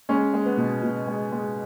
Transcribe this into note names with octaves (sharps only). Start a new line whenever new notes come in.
G#3 C#4
G#3
B3
B2
B2
G#3
G#3